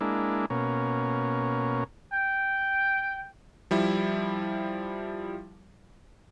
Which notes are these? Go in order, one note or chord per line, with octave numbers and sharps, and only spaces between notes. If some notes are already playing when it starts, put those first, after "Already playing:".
G#3 A#3 D4 E4
B2 A#3 C#4
G5
F3 G3 E4